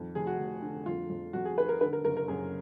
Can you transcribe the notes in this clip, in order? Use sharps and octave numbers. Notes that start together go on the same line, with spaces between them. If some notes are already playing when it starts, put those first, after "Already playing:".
Already playing: F2 D#3
F1 G#4
F#4
F1
D3
F2 F4
F2
F2 F#4
G#4
D#3 B4
A#4
D3 B4
A#4
F#1 A#4
A#4
F#2 G#4